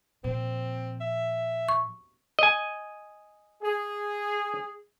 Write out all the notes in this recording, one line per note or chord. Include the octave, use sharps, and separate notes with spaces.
A#2 F3 C4
E5
C#6
D#5 G#5
G#4